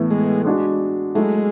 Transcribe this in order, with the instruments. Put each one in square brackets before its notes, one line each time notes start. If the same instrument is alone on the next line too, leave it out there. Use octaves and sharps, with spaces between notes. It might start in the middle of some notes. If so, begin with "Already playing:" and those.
Already playing: [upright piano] A2 E3 B3
[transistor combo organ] G#3
[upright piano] G#3 D4 F#4
[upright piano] F#3 A3 E4 [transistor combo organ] G#3